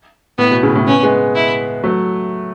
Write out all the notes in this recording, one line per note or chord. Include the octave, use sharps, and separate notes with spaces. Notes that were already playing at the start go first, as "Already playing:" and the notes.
A2 B3
B2
A2 C#3
A2 C#3
B3 C#4
G#3 B3
E4
F#3 A3